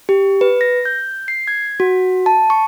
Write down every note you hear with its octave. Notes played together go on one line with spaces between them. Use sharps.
G4
B4
A#6
G6
C7
G#6
F#4
A5
C#6